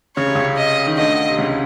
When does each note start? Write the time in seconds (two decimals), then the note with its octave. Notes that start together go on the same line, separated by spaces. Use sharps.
0.17 C#3 C#5
0.26 C3
0.35 C#2 C#3
0.57 D#5
0.87 D#3
0.98 D2 D3 D#5
1.28 C3
1.38 C#2 C#3